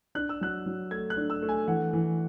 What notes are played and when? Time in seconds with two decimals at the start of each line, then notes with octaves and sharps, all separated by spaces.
0.15 D4 F#6
0.29 E6
0.41 F#3 F#6
0.66 F#3
0.91 A3 G#6
1.10 F#6
1.17 D4
1.30 E6
1.42 A3
1.49 G#5
1.68 E3 F#5
1.93 E3